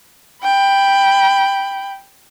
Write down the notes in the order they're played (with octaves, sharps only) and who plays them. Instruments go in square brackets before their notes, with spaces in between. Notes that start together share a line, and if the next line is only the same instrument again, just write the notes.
[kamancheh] G5 B5